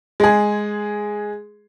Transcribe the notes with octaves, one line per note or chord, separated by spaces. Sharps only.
G#3 G#4